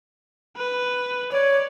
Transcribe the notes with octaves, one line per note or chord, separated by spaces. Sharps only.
B4
C#5 D5